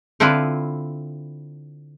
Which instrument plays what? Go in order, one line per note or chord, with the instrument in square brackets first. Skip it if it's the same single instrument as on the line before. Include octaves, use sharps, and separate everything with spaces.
[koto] D3 C4 E4 F4 B4